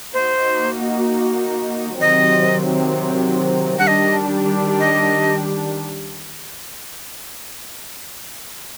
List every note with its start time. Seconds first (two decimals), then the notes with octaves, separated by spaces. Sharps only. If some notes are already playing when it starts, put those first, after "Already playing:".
0.14 A#3 D#4 F#4 C5
2.00 C3 D#3 F#3 C4 D#5
3.79 F#5
3.87 D#3 G3 D4 G4 D#5
4.80 D#5